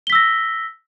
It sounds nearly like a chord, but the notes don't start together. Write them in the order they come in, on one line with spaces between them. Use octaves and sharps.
G7 B6 E6 A#6